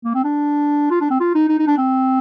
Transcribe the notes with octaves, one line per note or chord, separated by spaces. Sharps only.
A#3
C4
D4
F4
D4
C4
F4
D#4
D#4
D#4
D4
C4